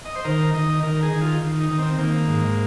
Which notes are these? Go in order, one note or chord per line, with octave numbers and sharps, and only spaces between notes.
D#5
C5
D#3 A#4
D#3 D#5
D#3 A#4
G#4
D#3
F4
D#3
D#4
D#3
C4
D#3 A#3
G#2